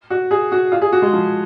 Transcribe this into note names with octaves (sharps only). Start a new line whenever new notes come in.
F#4
G#4
F#4
F4
G#4
F#4
G#3
F3